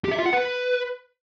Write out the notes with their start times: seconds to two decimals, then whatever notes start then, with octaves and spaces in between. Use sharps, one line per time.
0.04 G4
0.11 E5
0.19 F4
0.26 F#5
0.33 B4